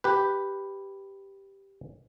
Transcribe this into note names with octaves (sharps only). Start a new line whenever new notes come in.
G4 B4